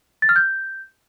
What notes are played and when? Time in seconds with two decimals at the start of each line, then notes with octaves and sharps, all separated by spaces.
0.22 A6
0.29 F6
0.36 G6